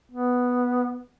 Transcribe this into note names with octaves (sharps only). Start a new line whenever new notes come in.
B3